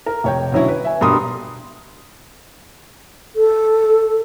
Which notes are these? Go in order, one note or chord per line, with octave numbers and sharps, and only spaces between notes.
A#4
F1 C#5 G5
B2 D3 F#3 C#4 E4
B4
E5 G#5
G2 B2 A#4 C6 D#6
A4